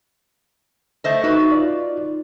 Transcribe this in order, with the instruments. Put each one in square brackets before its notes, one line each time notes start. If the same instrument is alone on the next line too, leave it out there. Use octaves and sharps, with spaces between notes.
[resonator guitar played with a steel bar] A3 C5 D#5 [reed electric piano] E5
[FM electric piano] D#4 [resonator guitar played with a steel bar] F#4 B4
[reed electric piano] F4 D5